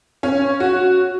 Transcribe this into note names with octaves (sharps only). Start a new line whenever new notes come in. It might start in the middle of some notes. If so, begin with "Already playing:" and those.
C#4
F#4